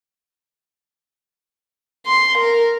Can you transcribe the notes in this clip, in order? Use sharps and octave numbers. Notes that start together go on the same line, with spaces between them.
C6
A#4